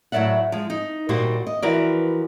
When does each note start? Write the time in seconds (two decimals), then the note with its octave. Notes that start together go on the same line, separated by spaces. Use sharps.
0.12 A2 F#3 A3 D5 E5 F#5
0.52 F3 G#3
0.70 D#4
1.09 D#2 A#2 G3 F#4 G4 C5
1.47 D#5
1.62 E3 F3 F#4 A#4 B4 D5